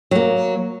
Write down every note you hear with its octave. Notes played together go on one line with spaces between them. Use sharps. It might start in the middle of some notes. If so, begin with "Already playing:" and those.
F#3 A#3